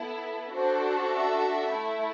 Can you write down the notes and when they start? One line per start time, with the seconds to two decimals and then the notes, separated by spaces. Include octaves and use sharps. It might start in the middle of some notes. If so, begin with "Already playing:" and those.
Already playing: B3 E4 A4
0.54 D4 F#4 A4 C5
1.12 E5
1.69 A3 E4 A4